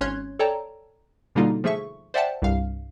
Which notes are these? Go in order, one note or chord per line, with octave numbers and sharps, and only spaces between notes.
G#1 C#4 C#5 C6 F#6 G#6
A4 C#5 D5 G5 A5 A#5
B2 D3 G3 A#3 D#4 F4
F3 A3 G#4 E5 C#6
C5 D5 E5 F#5 G5 A5
C2 G2 F5